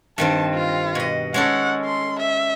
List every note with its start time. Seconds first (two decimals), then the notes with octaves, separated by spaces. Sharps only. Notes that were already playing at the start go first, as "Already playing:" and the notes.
0.18 G2 D#3 C4 A5
0.54 F4
0.95 B2 D#5
1.34 G#3 C#4 A4 F#5
1.85 C6
2.19 E5